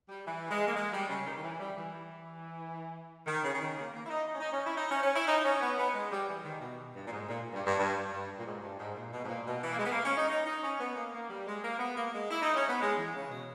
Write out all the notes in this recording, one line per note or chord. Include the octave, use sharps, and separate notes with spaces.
G3
E3
G#3
A#3
G#3
G3
C#3
D#3
D#3
E3
G3
E3
D#3
C#3
C#3
D#3
A#3
A#3
E4
D#4
D#4
C#4
D#4
C#4
E4
D#4
C#4
C#4
E4
D#4
C#4
B3
B3
G#3
G3
E3
D#3
B2
G2
A#2
G#2
A#2
G2
G2
G2
G2
A#2
G#2
G2
G#2
A#2
B2
G#2
A#2
B2
E3
A#3
G#3
B3
A#3
C#4
D#4
D#4
D#4
C#4
B3
A#3
A#3
G3
G#3
A#3
B3
A#3
G#3
E4
D#4
C#4
B3
G#3
E3
C#3
B2